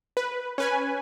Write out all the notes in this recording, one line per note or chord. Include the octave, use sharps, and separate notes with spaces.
B4
C#4 B4 G#5